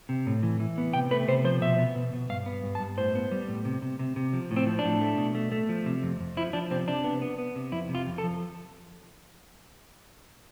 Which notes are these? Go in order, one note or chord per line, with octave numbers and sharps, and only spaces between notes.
C3
A2
E3
E3
B3
C3 G5
A3 B4
C3 C5
F3 C5
B2 E5
B3
B2
B2
G2 F5
B3
G2
A5
G2
A2 C5
B3
G3
A2
C3
C3
C3
C3
F3
A2
C4
F3
D4
A2
A3
B2
A3
A3
F3
C3
F2
F2
F3 E4
F3 D4
C3 C4
C3 D4
B3
B3
B3
C3
F2 E4
C3
F4
F2
A4
F3